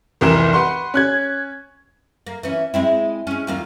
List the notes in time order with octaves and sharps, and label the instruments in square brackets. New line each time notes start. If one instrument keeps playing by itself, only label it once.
[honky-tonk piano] F1 C2 E3 A#4 E7
B4 F#5 C6 C#6
C#4 F#6 G#6
[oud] A#3
E3 C#4
G#3 C4 E4
G#3 C#4
D#2 A#3 F4